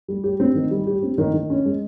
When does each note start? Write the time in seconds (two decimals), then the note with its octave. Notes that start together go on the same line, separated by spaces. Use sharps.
0.08 G3
0.24 G4
0.40 C4
0.55 D#3
0.71 G3
0.87 G4
1.02 C4
1.18 D#3
1.34 D#3
1.50 C#4
1.65 G#3